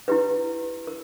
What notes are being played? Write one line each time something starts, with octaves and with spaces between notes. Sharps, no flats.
E4 G4 B4
A#4